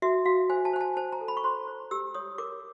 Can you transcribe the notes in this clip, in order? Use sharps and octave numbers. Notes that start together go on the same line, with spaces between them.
F#4 E5
F#4 F5
C5 G#5
A5
C5 G#5
A5
C5 A5
A#5
A4
B5
C#6
C5 C6
C5
G4 E6
C#5 D#6
A#4 D6